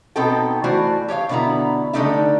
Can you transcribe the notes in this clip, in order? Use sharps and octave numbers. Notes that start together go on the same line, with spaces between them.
B2 B3 C4 D#4 A4 G5
E3 A3 F#4 C5 D5
G4 C#5 D5 F5
B2 D3 B3 E4 A#5
D3 G3 A3 D#4 D5 E5